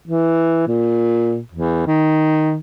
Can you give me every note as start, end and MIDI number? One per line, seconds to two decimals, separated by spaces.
0.08 0.63 52
0.68 1.39 46
1.52 1.84 40
1.86 2.57 51